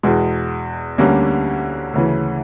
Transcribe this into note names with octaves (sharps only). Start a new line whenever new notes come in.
E2 B2 G#3
D2 D3 G3 A#3 C#4
D2 C#3 E3